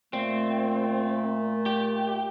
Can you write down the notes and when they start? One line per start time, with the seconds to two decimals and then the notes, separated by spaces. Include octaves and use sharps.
0.13 A#2 A3 C4
1.66 G4